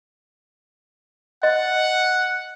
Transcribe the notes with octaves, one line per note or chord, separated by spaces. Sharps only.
D#5 F#5